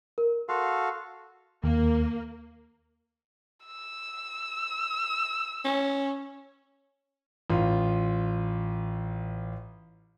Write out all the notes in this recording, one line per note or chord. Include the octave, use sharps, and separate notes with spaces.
A#4
F#4 A4 F5 C6
D#2 A#3
E6
C#4
A1 F4